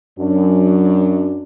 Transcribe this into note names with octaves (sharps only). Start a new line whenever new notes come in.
F#2 F#3 D4